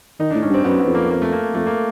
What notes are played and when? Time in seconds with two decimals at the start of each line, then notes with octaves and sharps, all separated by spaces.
0.20 D#3 D#4
0.30 A2 D4
0.42 G#2 C#4
0.50 G2 C4
0.64 F#2 B3
0.79 B3
0.87 F2
0.95 A#3
1.10 A#3
1.22 A3
1.32 A#3
1.54 F2 A3
1.66 A#3